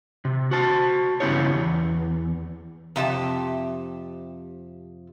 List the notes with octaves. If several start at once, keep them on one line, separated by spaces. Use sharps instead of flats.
C3
F#4 C5 A5
G2 C#3 B3 E4 G4 C#5
E2
F2 C3 G4 A5